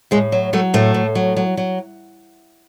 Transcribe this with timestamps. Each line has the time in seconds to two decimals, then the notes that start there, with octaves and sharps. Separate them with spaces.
0.11 A2 G#3
0.32 F#3
0.53 F#3 A3
0.74 A2 A3
0.94 A2
1.15 F#3
1.37 F#3
1.57 F#3